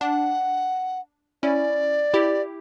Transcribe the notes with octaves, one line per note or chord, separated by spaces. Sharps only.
D4 F#5
C#4 E4 D5
E4 G4